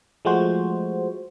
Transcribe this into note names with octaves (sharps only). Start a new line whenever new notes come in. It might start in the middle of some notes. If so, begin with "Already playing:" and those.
F3 G#3 A3 F#4 C5